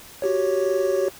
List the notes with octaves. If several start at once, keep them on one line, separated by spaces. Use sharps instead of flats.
F#4 G4 C#5